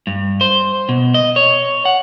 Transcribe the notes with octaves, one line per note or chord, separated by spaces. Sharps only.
G2
C5
B2
D#5
C#5
F#5